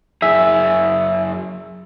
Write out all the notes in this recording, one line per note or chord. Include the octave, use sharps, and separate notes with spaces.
F#2 G#4 E5